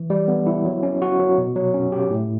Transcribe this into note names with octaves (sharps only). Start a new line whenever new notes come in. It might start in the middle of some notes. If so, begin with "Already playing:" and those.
Already playing: E3
G3
B3
E4
F#3
C#4
F#4
F#3
B2
F#3
C#4
G4
A2